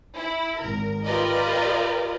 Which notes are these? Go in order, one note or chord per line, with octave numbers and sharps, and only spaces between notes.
E4
G#1 A#4
F4 G4 A#4 B4 D5 D#5